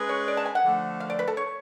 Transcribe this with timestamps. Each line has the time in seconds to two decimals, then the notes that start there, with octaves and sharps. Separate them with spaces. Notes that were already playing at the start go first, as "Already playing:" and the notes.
Already playing: G#3 C#4 G#4 B4
0.09 C#5
0.28 D5
0.37 A5
0.45 G#5
0.55 F#5
0.65 D3 F3 A3
1.00 F5
1.10 D5
1.19 B4
1.28 A4
1.37 C#5